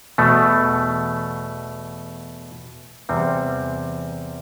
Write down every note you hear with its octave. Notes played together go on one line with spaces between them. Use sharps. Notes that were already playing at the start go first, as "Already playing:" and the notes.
E2 B2 A3
E2 C3 G3 C4